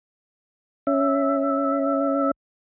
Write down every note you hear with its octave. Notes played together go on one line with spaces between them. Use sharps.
C#4 E5